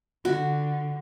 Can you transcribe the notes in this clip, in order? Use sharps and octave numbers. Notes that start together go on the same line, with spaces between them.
D3 F#4